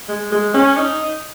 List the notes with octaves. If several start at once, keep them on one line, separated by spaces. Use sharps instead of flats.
G#3
G#3
C#4
D#4